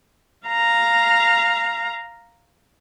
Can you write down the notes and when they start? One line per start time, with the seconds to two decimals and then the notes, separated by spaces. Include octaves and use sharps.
0.48 F5 A#5